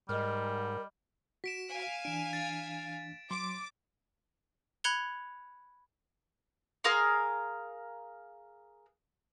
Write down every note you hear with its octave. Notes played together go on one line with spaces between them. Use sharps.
G#2 G3 A#4 D#5 F6
F#4 B6 D7 E7
F5 G#5
E3 D4 D7 E7
A6
F#3 C6 D6
B5 F#6 G#6 C#7 F7 G7
G#4 A#4 F5 C6